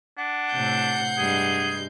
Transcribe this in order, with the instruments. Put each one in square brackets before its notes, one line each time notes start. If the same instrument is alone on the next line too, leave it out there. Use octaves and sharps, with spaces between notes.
[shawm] D4 [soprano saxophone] F#5
[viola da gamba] A2 C3 [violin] G6 C7
[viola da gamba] G2 G3 G#3 [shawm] G#4